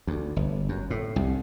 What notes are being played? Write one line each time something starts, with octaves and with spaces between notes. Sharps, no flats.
D2
G1
F#2
A2
C2